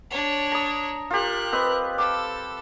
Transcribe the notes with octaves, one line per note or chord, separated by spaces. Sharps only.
D4 C#5
A#5 D#6
F4 G4 A#4 F#6
C4 B4 D#5
A4 D6